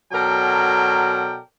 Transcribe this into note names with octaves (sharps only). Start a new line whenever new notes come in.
B2 F#3 A4 A#4 D5 G5